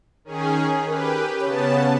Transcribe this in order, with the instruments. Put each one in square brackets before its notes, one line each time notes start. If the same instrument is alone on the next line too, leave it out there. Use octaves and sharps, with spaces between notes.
[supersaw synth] D#3 C#4 G#4
[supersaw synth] G4 B4 [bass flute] A#4
[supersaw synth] C#3 B3 A5 [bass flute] C#5